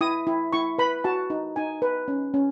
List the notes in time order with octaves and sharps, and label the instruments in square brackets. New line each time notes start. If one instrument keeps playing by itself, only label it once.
[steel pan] E4 D#6
E4
E4 C#6
B4 B5
F#4 A5
D#4
D#4 G#5
B4
C#4
C#4